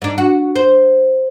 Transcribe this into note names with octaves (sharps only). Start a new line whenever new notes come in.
G#2 D4
F#4
C5